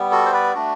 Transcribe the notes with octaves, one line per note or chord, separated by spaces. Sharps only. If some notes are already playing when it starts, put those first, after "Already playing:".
Already playing: G3 B3
F#4 A4
C5
B4 D5
A3 D4 F#4